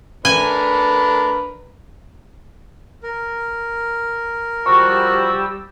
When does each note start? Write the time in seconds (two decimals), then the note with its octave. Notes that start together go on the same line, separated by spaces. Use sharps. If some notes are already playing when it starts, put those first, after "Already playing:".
0.25 A3 D4 A#4 B4 G#5
3.03 A#4
4.66 F3 G3 F#4 G4 C#6 E6